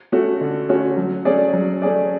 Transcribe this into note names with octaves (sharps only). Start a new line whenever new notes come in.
A3 C#4 F#4
D3
A3 C#4 F#4
F#3
A3 C#4 G#4 D5
F#3
A3 C#4 G#4 D5